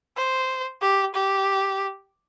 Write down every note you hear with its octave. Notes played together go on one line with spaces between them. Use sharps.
C5
G4
G4